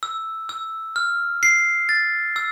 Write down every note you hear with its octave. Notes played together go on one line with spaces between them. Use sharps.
E6
E6
F6
C7
A6
E6